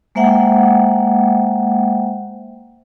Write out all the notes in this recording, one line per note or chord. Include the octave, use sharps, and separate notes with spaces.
G#3 A#3 C5 E5 F#5 G5